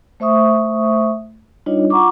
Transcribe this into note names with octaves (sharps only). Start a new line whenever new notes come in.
A3 C5 E5 C#6 D#6
G3 D4 D#4 F4 C#5 D#5
F4 F#5 A#5 C#6 D6